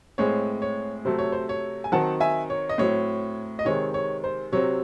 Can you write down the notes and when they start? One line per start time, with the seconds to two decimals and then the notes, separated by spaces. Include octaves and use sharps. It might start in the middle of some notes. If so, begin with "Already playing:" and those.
0.18 A2 G#3 C4 C#5
0.62 C#5
1.05 C3 F#3 A3 C5
1.19 C#5
1.32 C5
1.49 C#5
1.84 G#5
1.92 D#3 F#3 C4 F#5 A5
2.20 E5 G#5
2.50 C#5
2.69 D#5
2.78 A2 F#3 C4 C#5
3.59 D#5
3.65 C3 D#3 G#3 C4 C#5
3.94 C#5
4.24 C5
4.52 C3 F#3 C4 C#5